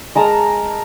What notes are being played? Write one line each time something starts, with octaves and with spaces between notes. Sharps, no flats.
G#3 A#4 A5 A#5